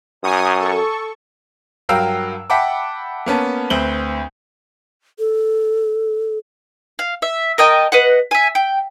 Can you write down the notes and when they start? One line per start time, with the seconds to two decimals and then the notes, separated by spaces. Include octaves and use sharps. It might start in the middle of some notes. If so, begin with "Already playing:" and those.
0.24 F#2 G#5 C#6 D#6
0.59 A4 C#6
1.89 G2 F#3 A#4 F5 G5 E6
2.50 E5 F#5 G5 A5 B5 D6
3.26 A#3 B3 C#4 A5
3.70 D2 C4 B4 F#7 G7
5.19 A4
6.99 F5
7.22 E5
7.58 A#4 D#5 G5 A5
7.92 B4 D#5 F#5
8.31 E5 G#5
8.55 G5